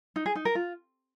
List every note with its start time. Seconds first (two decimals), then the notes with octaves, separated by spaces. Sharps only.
0.16 D#4
0.26 G#4
0.35 D#4
0.45 A#4
0.55 F4